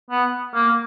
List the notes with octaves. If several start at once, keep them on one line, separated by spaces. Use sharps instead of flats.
B3
A#3